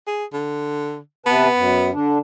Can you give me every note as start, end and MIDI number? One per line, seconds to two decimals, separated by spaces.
0.07 0.25 68
0.33 0.98 50
1.26 1.47 48
1.26 1.90 59
1.26 1.47 71
1.26 1.47 81
1.56 1.91 42
1.93 2.18 50
1.93 2.18 62